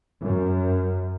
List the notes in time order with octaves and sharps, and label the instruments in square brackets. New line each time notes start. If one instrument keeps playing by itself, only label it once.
[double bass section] F#2